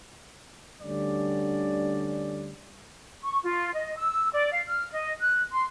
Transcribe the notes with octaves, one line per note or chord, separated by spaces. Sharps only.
D2 D3 G3 C#4 D5
C#6
F4
D#5
E6
D5
F5
F6
D#5
F#6
C6